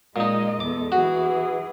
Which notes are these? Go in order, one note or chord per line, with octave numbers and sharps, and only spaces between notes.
A#2 G#3 D#4 D#5
E2 A4 D6
E3 F#4 G#4